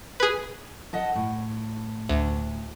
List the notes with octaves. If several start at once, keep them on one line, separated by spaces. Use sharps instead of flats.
G#4 B4
A4 D#5 F#5
A2
D2